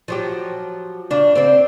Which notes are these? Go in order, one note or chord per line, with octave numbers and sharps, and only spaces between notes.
F3 F#3 G4
C#3 D4
C4 D5